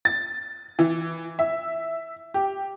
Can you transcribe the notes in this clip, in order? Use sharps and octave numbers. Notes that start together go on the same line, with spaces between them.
A6
E3
E5
G4